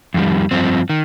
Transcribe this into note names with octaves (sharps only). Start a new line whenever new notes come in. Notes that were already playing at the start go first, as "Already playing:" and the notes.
F2 D#3 G3
G2 F3 C4
D#3